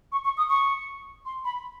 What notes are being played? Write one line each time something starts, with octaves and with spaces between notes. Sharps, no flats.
C#6
C#6
D#6
C#6
C6
B5